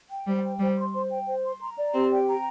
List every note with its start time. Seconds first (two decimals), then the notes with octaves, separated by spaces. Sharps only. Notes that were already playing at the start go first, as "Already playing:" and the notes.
0.10 G5
0.27 G3 C5
0.43 G5
0.60 G3 C5
0.77 C6
0.94 C5
1.10 G5
1.27 C5
1.44 C6
1.60 A#5
1.77 D5
1.94 C4 G4
2.10 G5
2.28 A#5